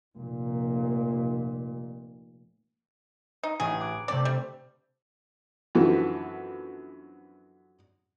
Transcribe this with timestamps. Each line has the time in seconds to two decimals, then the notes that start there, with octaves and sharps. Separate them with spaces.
0.16 F1 A#2
3.43 D#4
3.60 A1 G#4
3.81 D6 F#6 G#6
4.08 C3 A3 C4 D5
4.25 G3
5.75 F#2 D3 E3 F3 B3 F#4